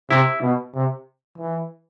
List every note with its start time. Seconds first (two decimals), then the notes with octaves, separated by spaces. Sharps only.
0.10 C3 E4
0.42 B2
0.74 C3
1.38 E3